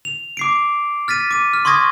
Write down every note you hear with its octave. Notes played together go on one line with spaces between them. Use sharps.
F7
D6 C7 D7
F6 A6 B6 D#7
D6 D#7
F6
C6 C#6 D#6 G#6 A#6